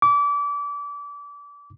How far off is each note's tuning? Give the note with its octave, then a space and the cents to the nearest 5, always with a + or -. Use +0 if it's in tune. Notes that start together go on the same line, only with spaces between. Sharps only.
D6 -30